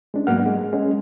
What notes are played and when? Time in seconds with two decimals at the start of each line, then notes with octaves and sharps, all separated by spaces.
0.14 G#3 C#4 D4
0.27 G#2 F#3 A#3 B3 F#5 F6
0.46 G#3
0.73 G#3 C#4